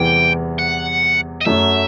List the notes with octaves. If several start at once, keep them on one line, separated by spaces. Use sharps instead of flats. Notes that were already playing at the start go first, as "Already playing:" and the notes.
Already playing: E2 C3 E3 G3 G5
F#5
D#5
F#2 F#3 A3 E5